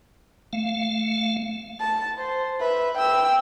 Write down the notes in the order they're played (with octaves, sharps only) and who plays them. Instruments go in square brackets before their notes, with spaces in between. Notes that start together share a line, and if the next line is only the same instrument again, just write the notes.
[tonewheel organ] A3 F5
[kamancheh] A5
C5
B4 E5
G5 E6